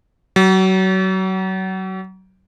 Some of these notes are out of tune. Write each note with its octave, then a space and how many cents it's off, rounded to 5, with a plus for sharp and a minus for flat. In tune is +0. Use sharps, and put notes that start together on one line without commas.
F#3 +30